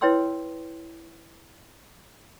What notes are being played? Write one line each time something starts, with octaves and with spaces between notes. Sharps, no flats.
E4 B4 C#5 G5 C6 E6